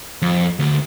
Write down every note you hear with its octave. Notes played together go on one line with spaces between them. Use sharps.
F2
D2